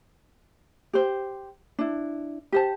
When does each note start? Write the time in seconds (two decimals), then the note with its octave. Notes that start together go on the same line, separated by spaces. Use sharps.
0.93 G4 C5
1.79 D4 E4
2.52 G4 C5 A5